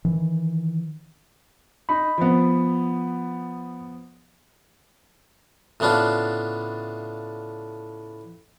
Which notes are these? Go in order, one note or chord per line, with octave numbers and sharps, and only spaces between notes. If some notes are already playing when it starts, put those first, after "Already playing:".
D#3 E3
D#4 B5
F3 B3
A2 C#3 B3 D4 F4